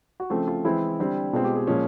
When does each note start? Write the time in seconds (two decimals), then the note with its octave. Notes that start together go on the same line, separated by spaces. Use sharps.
0.20 F#4
0.30 C#3 F3 A3 C4 F4
0.48 F4
0.65 E3 G#3 C4 E4
0.99 D3 G3 C4
1.33 B2 G#3 C4 F4
1.44 G4
1.56 G#4
1.67 A#2 F3 G#3 C#4